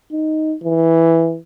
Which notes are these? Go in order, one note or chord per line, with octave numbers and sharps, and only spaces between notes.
D#4
E3